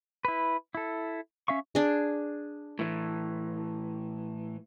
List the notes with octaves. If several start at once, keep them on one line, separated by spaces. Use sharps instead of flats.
E4 B4
E4 A4
C#4 E5 F5 C#6
D4 G#4
A2 E3